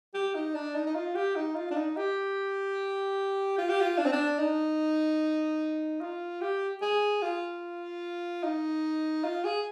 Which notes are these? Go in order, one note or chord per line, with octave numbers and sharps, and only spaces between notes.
G4
D#4
D4
D#4
D#4
F4
G4
D#4
F4
D4
D#4
G4
F4
G4
F4
D4
C4
D4
D#4
F4
G4
G#4
F4
D#4
F4
G#4